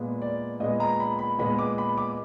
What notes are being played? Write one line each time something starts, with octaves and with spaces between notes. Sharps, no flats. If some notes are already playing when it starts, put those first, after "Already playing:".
Already playing: A#2 G#3 B3
D5
A#2 G#3 B3 D#5
A#5
B5
B5
A#2 G#3 B3 B5
D6
B5
D6